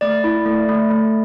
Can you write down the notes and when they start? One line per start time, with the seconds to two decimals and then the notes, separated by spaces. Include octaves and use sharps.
0.01 A3 D5
0.24 E4
0.46 A3
0.69 A3
0.90 A3